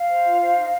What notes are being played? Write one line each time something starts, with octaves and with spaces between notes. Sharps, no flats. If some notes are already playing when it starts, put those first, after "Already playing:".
Already playing: F5
C5
F4
C5
D#4